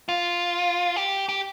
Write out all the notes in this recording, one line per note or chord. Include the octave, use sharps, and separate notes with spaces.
F4
G4
G4